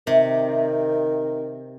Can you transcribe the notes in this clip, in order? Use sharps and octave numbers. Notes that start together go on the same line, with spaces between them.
C3 D#3